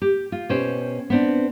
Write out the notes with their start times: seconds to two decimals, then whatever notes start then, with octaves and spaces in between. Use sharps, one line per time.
0.02 G4
0.32 F4
0.49 B2 C#4 G4 C5 G5
1.10 B3 C4 D4